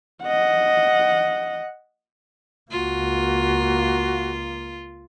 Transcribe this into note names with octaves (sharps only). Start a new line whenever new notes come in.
D#5 F#5
C#2 A#3 F4 F#4